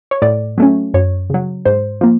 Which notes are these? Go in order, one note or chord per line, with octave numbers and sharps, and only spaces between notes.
C#5
A2 D5
F#3 A3 C#4
F#2 C#5
C#3 F#3
G#2 C5
F3 A#3